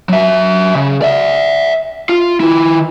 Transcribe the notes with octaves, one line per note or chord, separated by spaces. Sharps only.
F#3 E5
C#3
D5 E5
F4
D#3 E4